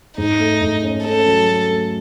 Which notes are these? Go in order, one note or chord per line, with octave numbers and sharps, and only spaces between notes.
G#2 D#4
A3
G#2
C#4
C#4 A4
F#3
A3
A3